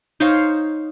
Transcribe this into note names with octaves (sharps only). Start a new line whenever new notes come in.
D#4 C5 C#5 F5